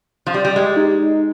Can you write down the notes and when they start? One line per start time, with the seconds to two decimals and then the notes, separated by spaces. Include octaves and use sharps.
0.27 F3 F4
0.34 G3 G4
0.45 G3
0.56 G#3
0.77 D#4